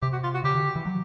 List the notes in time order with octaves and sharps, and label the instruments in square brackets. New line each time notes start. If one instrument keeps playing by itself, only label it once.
[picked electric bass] C3 [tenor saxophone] G4
[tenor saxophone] F#4
F4
F#4
[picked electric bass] C#3 [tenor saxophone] G4
[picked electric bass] D3
E3
F#3